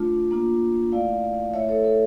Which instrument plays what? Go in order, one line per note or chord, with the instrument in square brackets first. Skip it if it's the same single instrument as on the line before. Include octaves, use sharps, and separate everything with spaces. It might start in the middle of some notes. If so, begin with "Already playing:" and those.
Already playing: [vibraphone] A3 D4 F4
A#3 D4 F4
A3 E4 D5 F5
A3 E4 C#5 E5
A4 C#5
A4